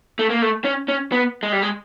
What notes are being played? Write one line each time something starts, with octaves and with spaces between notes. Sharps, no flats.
A3
A#3
A3
C#4
C#4
B3
G#3
G3
G#3